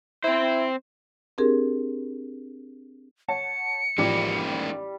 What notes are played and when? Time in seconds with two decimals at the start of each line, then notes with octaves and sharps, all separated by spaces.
0.24 C4 E4 C5
1.38 C4 D4 G4 G#4 A#4
3.28 C#5 F#5 A5 C#7
3.98 A1 F3 G3 G#3 A#3 D#4 D6